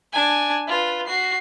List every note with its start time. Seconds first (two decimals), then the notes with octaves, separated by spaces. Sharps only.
0.13 D4 G#5
0.68 F4 B4
1.07 F#4 C7